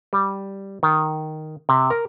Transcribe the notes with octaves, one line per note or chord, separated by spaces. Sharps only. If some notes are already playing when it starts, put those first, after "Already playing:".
G3
D#3
C3
A#4